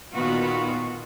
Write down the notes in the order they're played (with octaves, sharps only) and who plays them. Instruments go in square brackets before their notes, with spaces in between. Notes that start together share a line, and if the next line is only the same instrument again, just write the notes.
[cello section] A#2 D#3 B3 F4 F#4